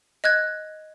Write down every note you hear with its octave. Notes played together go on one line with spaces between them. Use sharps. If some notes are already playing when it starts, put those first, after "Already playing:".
D#5 F#6 G#6